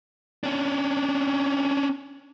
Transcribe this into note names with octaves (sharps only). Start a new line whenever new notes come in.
C#4 D4